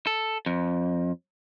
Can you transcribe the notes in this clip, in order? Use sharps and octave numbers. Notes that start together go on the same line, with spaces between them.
A4
F2